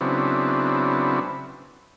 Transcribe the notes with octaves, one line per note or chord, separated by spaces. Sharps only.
C#3 F#3 B3 C4 D4 E4